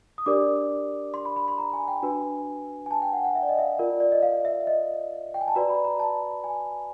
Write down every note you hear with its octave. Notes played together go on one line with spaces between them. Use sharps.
D#6
D4 G4 A#4 D5 D6
C6
B5
B5
C6
A#5
G#5
G5
D4 F#4 B4 G#5
G#5
A5
G5
F#5
F#5
E5
D5
D#5
E5
F5
F4 A#4 D5
D5
D#5
F5
E5
D#5
G5
G#5
A5
F#4 B4 D5 A#5
B5
A#5
A5
G#5